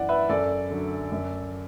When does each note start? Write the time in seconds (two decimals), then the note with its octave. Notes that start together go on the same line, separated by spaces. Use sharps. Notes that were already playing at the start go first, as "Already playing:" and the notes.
Already playing: F#2 E3 D5 F#5
0.09 B4 E5
0.29 F#2 A4 D5
0.70 D3 F#3
1.12 F#2